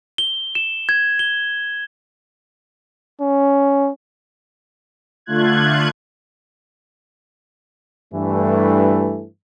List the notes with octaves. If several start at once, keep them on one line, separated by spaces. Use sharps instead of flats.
G7
E7
G#6
G7
C#4
D3 A3 F4 F#6 G#6
G2 E3 A3